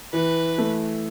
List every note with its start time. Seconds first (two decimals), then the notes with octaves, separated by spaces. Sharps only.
0.13 E3 B4
0.58 A3